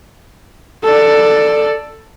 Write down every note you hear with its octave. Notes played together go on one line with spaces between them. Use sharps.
A4 D5